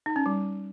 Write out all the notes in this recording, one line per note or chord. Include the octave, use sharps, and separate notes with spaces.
D#4
C#4
G3